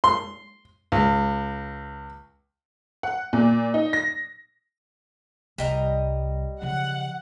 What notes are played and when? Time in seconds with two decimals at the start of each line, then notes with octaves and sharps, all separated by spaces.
0.04 C6
0.92 C#2
3.03 F#5
3.33 A#2
3.74 D#4
3.93 A#6
5.58 C2 G3 D#5 A#5
6.62 C#3 F3 F#5